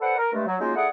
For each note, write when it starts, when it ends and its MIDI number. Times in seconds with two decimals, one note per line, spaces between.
0.01 0.15 69
0.01 0.15 71
0.01 0.15 72
0.01 0.15 74
0.01 0.15 78
0.17 0.32 70
0.33 0.45 43
0.33 0.45 56
0.33 0.45 57
0.47 0.56 54
0.60 0.73 54
0.60 0.73 56
0.60 0.73 58
0.60 0.73 61
0.60 0.73 63
0.60 0.73 65
0.76 0.88 57
0.76 0.88 64
0.76 0.88 68
0.76 0.88 74
0.76 0.88 78